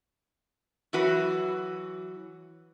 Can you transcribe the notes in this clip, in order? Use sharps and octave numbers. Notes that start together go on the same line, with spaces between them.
E3 F#3 F#4 B4